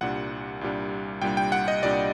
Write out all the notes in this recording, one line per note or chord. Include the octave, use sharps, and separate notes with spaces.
C2 A#2 G3 D4 F#5
C2 A#2 G3 D4
C2 A#2 G3 D4 G5
G5
F#5
D#5
C2 A#2 G3 D4 D5